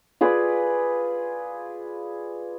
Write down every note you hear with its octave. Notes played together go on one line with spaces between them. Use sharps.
F4 G#4 B4 D5